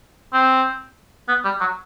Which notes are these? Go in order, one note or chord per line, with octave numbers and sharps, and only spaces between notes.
C4
B3
G3
F#3